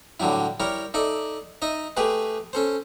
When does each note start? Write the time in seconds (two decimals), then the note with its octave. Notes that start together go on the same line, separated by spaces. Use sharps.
0.20 A2 D3 F#3 G3 E4
0.60 G3 E4 A#4 C#5
0.94 D#4 A4 D5 E5
1.62 D#4 D#5 E5
1.97 A3 G4 G#4 B4
2.53 C#4 A4 C5